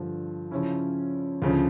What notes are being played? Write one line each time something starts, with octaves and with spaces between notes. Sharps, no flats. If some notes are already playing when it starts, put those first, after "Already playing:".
Already playing: G2 D3 F3
C#3 F3 C#4 E4
D2 C#3 F3